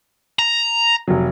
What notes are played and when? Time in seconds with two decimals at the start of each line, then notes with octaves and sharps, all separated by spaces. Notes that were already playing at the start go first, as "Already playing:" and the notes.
0.39 A#5
1.08 F1 F#3